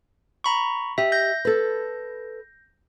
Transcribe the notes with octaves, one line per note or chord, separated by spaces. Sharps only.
A#5 B5 C#6
G4 D#5 E5
G6 A#6
A4 B4